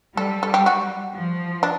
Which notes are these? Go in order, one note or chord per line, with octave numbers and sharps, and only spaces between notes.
G3 A4
A4
G4
F#4
F3
D4